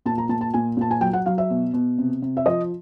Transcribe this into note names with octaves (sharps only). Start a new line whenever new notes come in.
A#2 A5
A#5
A#2 A5
A5
A#2 G#5
A#2 A5
G#5
F#3 G5
F#5
F#3 F5
E5
B2
B2
C3
C3
E5
F3 D#5